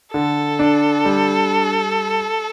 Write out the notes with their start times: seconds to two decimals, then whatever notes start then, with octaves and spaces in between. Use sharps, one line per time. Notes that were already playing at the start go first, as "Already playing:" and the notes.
0.13 D3 A4
0.59 D4
1.05 G3